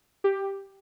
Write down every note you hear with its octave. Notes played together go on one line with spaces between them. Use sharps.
G4